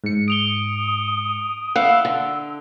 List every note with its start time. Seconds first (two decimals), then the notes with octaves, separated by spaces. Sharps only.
0.04 G#2 C#7
0.28 D#6 D7 F7 G7
1.76 E4 F5 F#5 E6
2.05 D3